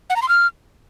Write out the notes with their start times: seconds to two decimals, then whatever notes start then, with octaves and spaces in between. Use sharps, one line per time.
0.10 F#5
0.16 A#5
0.22 C6
0.29 F6